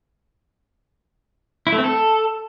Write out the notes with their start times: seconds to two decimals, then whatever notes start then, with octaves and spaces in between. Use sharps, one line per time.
1.67 E4
1.72 A3
1.78 C4
1.84 A4